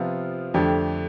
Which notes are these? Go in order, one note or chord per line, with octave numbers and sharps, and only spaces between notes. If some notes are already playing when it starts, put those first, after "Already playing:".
Already playing: C3 F3 B3 F4
F2 D3 A3 D4 G4